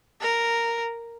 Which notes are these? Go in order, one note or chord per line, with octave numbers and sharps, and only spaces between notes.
A#4